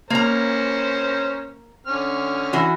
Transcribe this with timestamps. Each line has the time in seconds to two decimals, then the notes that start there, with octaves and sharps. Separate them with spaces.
0.10 A#3 C#4 A#4 C5 A#5
1.87 D3 C#4 F6
2.53 E3 F#4